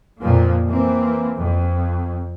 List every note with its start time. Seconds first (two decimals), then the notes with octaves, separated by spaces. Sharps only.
0.20 F2 A#2 F3 A#3
0.67 E3 A#3 C4
1.37 F2